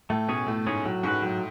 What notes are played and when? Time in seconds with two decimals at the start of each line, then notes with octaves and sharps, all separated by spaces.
0.10 A2 A3
0.28 B2 C#4 G#4 C#5
0.47 A2 A3
0.66 G#2 C#4 G#4 C#5
0.85 A2 F#3
1.03 G#2 C#4 F#4 B4
1.22 A2 F#3